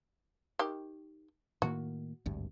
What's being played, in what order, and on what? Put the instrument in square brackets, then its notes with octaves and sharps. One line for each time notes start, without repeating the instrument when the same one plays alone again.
[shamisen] D#3 G4
[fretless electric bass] A2 D#3 A#3 [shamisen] F#4
[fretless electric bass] G#1 D2 G2